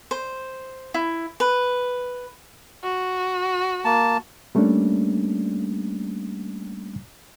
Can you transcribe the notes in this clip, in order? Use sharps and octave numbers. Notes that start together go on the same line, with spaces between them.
C5
E4
B4
F#4
A#3 A5
G3 A3 A#3 C#4 D4